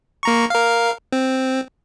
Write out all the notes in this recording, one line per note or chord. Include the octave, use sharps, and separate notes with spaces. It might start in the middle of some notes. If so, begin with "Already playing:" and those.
A#3 A#5 C#6
A#4 F5
C4